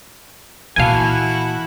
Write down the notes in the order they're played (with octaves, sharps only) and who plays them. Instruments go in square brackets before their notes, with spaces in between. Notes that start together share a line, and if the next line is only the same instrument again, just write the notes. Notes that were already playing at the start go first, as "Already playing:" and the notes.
[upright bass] A#2 E3 [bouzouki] A#3 A4 [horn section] E4 F#4 [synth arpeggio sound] F5 G#5